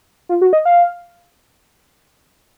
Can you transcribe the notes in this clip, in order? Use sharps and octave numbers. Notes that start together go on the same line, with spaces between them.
F4
F#4
D#5
F5